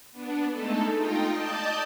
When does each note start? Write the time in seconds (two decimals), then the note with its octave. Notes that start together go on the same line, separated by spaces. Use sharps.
0.12 B3 D4
0.52 G#3 A3 D#4 A4
0.95 D#4 F4 D#5 G5
1.30 D5 D#5 A5 D#6 G6